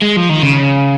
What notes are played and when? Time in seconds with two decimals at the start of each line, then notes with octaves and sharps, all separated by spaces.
0.02 G#3
0.16 F3
0.29 D#3
0.43 C#3